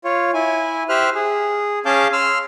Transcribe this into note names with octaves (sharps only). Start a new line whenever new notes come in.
F4 C#5
E4 G#5
G4 C5 E5 F6 F#6
G#4
C#4 G#4 F5 A5 D6 G6
C6 E6 F6